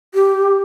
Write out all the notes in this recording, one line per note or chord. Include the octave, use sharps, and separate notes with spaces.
G4